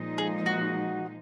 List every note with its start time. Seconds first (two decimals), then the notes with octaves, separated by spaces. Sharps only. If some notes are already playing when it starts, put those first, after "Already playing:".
Already playing: A#2 F3 G#3 D#4
0.18 G#4
0.46 F#4